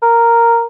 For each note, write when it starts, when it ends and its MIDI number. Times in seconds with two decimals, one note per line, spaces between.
0.02 0.65 70